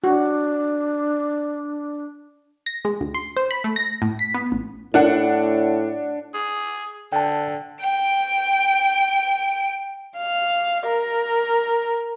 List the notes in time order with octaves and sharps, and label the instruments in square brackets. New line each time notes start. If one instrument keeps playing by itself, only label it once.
[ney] D4 [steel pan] F#4
[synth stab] A#6
G#3
D2
C6
C5
B5
A3
A#6
A2
B6
B3
A1
[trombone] A2 [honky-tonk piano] D4 F#5
[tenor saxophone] G#4
[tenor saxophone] D3 [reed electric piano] G5 A5
[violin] G5 D7
[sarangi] F5
A#4